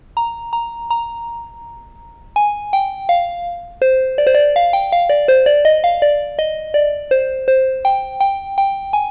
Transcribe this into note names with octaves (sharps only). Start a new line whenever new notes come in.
A#5
A#5
A#5
G#5
G5
F5
C5
D5
C5
D5
F5
G5
F5
D5
C5
D5
D#5
F5
D5
D#5
D5
C5
C5
G5
G5
G5
G#5